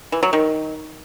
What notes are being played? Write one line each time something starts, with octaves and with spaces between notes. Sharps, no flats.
E3
F#3
D#3